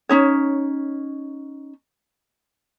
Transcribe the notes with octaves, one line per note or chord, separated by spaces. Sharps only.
C#4 D#4 C#5